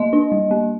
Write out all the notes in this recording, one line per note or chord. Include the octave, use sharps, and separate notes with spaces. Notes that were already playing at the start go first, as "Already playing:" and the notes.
Already playing: A#3 D#5
D4
G3
A#3